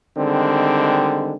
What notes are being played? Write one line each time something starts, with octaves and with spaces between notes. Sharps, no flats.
D3 D#3 G3 G#3 C4